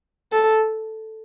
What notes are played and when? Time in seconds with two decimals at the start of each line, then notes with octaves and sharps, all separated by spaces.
0.32 A4